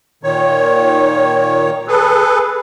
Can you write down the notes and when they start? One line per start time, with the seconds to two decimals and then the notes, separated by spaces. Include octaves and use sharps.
0.23 A#2 D#3 C#5
1.87 G#4 A4 B4